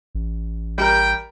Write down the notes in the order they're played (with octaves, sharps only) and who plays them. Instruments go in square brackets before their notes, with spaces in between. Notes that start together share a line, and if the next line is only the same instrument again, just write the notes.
[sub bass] A1
[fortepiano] G3 G4 A#4 [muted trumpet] G5